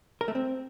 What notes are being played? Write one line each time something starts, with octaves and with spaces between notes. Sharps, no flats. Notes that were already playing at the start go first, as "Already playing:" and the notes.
A#4
A3
C4